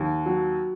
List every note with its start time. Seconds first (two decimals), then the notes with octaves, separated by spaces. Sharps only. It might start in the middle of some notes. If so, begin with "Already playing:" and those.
Already playing: D#2
0.26 F#3